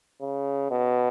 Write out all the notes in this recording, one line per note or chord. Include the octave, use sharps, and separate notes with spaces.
C#3
B2